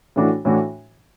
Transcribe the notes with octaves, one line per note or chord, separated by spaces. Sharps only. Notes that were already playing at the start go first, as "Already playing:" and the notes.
A2 E3 A3 D4 F#4
A2 E3 A3 D4 F#4